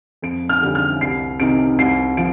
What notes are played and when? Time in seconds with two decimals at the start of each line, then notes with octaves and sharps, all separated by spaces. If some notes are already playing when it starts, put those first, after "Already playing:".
0.22 F2 D7
0.49 F6
0.62 D3 G3
0.75 F6
1.01 C2 C7
1.40 C3 D#3 D7
1.79 C2 C7
2.17 F3 D7